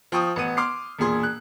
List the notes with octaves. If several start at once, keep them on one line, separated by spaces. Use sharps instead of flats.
F3 G5 C#6 D#6
A1 B3 F#5 D#7
C6 D6 F6 C7
E1 A#2 G#4 C6
F#6